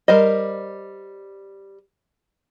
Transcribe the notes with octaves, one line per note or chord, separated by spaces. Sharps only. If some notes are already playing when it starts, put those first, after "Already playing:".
G3 A#4 C5 D#5